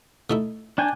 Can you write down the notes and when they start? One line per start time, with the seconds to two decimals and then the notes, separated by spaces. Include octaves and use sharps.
0.30 A3 D#4 E4
0.78 D4 G5 G#5